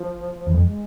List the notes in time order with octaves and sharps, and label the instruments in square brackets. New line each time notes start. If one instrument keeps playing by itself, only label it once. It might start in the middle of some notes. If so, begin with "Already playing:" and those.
Already playing: [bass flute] F3
[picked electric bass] E2
F2
[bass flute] G#3